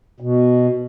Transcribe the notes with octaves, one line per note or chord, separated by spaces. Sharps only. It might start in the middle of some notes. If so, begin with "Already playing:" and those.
B2